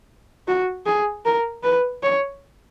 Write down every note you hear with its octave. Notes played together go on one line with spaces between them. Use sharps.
F#4
G#4
A#4
B4
C#5